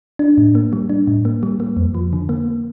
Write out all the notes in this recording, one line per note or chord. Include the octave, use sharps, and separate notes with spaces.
D4
A2
A#3
G3
D4
A2
A#3
G3
A#3
F2
F3
D3
A#3